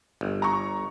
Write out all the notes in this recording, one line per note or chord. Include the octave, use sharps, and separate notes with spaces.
G1
A#5 C#6